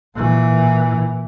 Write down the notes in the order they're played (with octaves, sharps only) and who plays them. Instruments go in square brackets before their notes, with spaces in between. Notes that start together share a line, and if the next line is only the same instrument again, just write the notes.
[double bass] A#2 E3